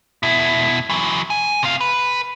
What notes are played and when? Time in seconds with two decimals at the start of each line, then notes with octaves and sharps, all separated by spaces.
0.23 B2 E4
0.89 E3 F#3
1.30 G#5
1.63 C3 F5
1.81 B4